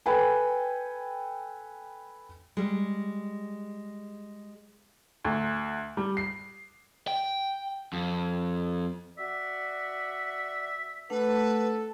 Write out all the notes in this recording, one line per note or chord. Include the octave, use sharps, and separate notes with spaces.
A4 B4 G5 G#5
G3 G#3
D2
G3
C7
G5
F2
F#4 D5 E5
A3 D4 A4 B4 F#5